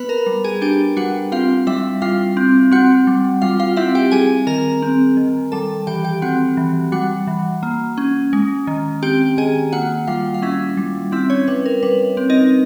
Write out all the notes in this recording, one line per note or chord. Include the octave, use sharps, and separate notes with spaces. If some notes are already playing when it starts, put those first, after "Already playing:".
Already playing: B3 B4 B5
A#4 A#5
G3
G#4 G#5
D4 G4 G5
G3 F#4 F#5
C4 F4 F5
G3 E4 E5
G3 F4 F5
C4
C4 F#4 F#5
G3
G3 F4 F5
F4 F5
C4 E4 E5
G4 G5
G3 G#4 G#5
D#3 A#4 A#5
C4
D#3
G3 A4 A5
E3 G4 G5
G4 G5
C4 F#4 F#5
E3
G3 F#4 F#5
E3
A#3
C#4
G#3
D#3
C4 G4 G5
D#3 G#4 G#5
A#3 F#4 F#5
G3 F4 F5
F5
C#4 E4 E5
G3
C4 E4 E5
C#4 C#5
G3 B4
A#4
G3 B4
C4
D#4 D#5